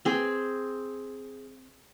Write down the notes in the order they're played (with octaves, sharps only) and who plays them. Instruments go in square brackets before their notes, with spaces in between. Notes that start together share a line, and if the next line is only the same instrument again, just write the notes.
[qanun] C4 G#4